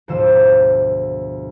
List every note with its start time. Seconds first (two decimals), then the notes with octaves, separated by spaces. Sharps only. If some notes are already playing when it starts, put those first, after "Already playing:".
0.08 D2 G#2 B2 F3 C5 E6